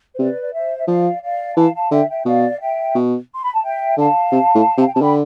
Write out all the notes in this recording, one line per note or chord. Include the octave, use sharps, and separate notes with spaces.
C5
C3 B4 D5
D5
C5 E5
E5
F3 D5 F5
D5 F5
E3 F5 A5
F5 A5
D3 E5 G5
E5 G5
B2 D5 F5
F5
E5 G5
B2
C6
B5
A5
E5 G5
D3 F5 A5
C3
A2
C3 F5
G5
C3 A5
D3 G5 B5